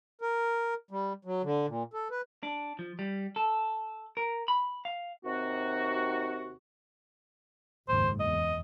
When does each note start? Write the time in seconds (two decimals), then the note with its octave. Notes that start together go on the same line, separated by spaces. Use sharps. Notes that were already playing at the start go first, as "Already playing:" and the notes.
0.21 A#4
0.91 G3
1.25 F#3
1.43 D3
1.67 A#2
1.94 A4
2.11 B4
2.43 D4
2.79 F3
2.99 G3
3.36 A4
4.17 A#4
4.48 B5
4.85 F5
5.24 D#2 C3 C4 D#4 F#4
7.89 F#1 D#2 G#2 C5
8.20 E2 D#5